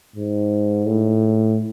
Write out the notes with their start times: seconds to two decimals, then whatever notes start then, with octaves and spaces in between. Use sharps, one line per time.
0.16 G#2
0.86 A2